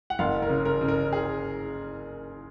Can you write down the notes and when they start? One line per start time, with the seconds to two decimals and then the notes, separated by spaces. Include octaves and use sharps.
0.10 F#5
0.19 F#1 F5
0.42 A#4
0.50 C#3
0.65 A#4
0.81 C#3
0.88 A#4
1.12 G#4